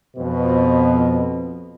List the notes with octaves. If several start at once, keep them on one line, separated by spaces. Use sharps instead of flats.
F2 B2